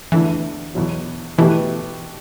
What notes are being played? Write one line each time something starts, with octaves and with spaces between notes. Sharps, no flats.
E2 D3 E3 A3 E4
E2 B2 F#3
B2 E3 A3 E4 G4 B4